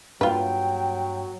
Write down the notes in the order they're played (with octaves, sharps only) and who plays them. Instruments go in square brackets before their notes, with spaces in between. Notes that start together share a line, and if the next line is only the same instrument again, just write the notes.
[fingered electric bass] G2 A#3 [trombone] F#3 [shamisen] F4 B4 [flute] G5